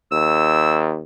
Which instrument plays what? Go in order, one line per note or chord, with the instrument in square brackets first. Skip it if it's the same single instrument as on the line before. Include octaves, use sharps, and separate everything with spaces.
[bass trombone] D#2 [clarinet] E6